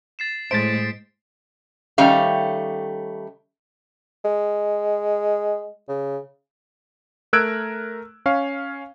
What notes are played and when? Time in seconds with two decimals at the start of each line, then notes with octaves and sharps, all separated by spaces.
0.19 A6 C7 E7
0.51 A2 G#3 C5 A6 B6 D7
1.98 D#3 G3 A3 C#4 F5
4.24 G#3
5.88 C#3
7.33 A3 A#4 E6 F#6 G#6 D7
8.26 C#4 C#5 F5